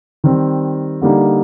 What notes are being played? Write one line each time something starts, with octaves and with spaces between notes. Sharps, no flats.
D#3 G3 C4
D3 G3 A#3 D#4